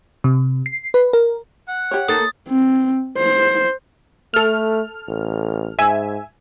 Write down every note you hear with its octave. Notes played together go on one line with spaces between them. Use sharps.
C3
C7
B4
A#4
F#5
G4 C#5
A#3 D#4 A4 D#6 A6
C4
C5
A3 A4 F6
A1
G#2 E5 G#5